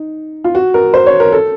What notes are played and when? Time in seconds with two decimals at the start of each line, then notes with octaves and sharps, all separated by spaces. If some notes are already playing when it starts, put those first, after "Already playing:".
Already playing: D#4
0.44 F4
0.55 F#4
0.74 A#4
0.94 C5
1.06 C#5
1.20 A#4
1.32 A4